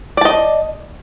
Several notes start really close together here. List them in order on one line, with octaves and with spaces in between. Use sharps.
D5 A5 D#5